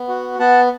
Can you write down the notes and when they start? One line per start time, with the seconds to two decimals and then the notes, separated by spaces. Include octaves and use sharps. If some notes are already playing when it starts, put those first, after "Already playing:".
Already playing: B3
0.08 F#4
0.39 B3 F#5 A5